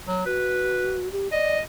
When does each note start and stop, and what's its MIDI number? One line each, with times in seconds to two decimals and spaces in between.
0.08 0.23 54
0.26 1.10 66
0.26 1.02 71
1.12 1.30 67
1.32 1.57 74
1.32 1.61 75